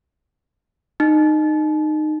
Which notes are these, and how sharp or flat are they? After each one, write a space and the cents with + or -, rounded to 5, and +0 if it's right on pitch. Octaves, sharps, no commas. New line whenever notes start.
D#4 -20